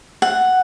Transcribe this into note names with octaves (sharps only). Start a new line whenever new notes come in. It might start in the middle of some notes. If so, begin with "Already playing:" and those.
F#5